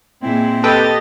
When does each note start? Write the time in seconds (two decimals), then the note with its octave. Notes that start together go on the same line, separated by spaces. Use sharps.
0.23 A#2 G#3 C4 E4
0.64 G4 A4 B4 D#5 G5 A6